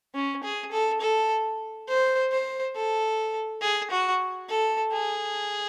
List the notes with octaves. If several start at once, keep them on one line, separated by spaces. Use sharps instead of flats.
C#4
G#4
A4
A4
C5
C5
A4
G#4
F#4
A4
G#4